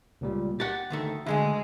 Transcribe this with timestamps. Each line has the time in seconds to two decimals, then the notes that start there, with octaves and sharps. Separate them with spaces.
0.21 C#2 A#2 G3
0.60 G4 F#5 A6
0.90 D2 D#3 A3
1.26 D2 G2 D3 G#3